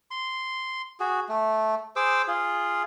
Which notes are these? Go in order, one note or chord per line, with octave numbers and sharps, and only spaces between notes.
C6
F#4 G#4
A3
G#4 C5 D6 E6
F4 G#4